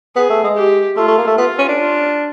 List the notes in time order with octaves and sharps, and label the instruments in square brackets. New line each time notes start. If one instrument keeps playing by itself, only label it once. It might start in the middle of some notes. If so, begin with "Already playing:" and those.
[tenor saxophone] B3 [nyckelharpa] G#4
[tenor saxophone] A3
G#3
[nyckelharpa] G4
[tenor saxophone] A3 [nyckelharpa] F4
[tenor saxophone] A3
A#3
A3
[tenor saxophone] B3 [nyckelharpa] F4
[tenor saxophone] C#4
D4
[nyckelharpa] F4